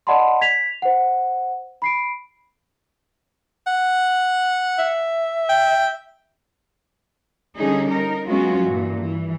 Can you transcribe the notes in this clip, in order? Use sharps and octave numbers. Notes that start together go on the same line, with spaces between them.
D5 D#5 F#5 A5 B5 C6
G#6 B6 F7
C5 F#5
B5 C7 D7
F#5
E5
G5
D3 G3 C#4 D#4 G#4
D#4 A#4
F#3 G#3 B3 C#4 F4 F#4
G2 A#2 E3
E3